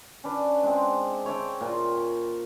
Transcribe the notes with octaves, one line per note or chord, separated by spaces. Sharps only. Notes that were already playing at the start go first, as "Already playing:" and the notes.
C#4 D4 B4
G#3 C4
C#5 E5 G5 A5
A#2 F4